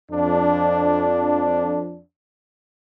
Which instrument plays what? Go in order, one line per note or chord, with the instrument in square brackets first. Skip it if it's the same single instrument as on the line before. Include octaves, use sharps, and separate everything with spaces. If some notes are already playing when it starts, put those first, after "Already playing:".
[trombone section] F2 D4